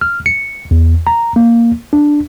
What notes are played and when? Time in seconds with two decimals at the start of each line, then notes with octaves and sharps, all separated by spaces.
0.01 F6
0.26 C#7
0.71 E2
1.07 A#5
1.36 A#3
1.93 D4